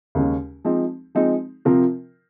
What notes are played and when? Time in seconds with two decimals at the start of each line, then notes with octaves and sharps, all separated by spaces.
0.15 D#2 C#3 G#3 C#4
0.65 F3 G#3 C4 D#4
1.15 F3 G#3 C4 D#4
1.65 C3 F3 C4 F4 A#4